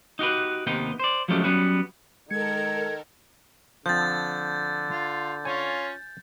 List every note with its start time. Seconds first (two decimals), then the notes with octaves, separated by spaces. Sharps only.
0.19 D#4 F#4 G4 B4
0.67 D#2 C3 B3 D#4 G5
0.99 C5 D5
1.28 F3 F#3 G#3 A3 C#4 G4
1.44 F#3 G3 B3 C#4 F#4
2.31 D#3 G#3 A4 A#4 G#6 C#7
3.86 D3 F3 C4 G6 A6
4.90 F4
5.45 C#4 F4 C#5 G#5